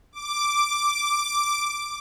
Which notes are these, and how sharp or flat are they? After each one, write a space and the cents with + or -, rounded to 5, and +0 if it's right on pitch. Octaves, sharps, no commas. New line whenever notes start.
D6 +0